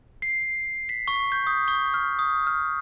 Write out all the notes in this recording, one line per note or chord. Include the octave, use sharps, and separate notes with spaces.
C7
B6
C#6
G6
D#6
C#6
F6
D#6
F6